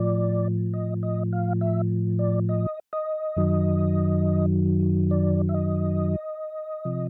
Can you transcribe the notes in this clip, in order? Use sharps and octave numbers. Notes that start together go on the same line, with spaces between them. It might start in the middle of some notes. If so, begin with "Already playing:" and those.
Already playing: A2 F3 D5
D#5
D#5
F5
E5
D5
D#5
D#5
F#2 D#3 F#3
D5
E5
D#5
C3 F3